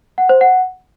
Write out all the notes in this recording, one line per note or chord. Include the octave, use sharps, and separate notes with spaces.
F#5
C5
F#5